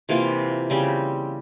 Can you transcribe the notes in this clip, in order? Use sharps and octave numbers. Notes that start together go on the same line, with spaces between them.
C3 E3 A#3 F4
C#3 G3 C4 G4